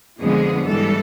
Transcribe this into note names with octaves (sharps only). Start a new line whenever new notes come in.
F2 D3 F3 G#3 B3 G#4
G#2 E3 G3 A4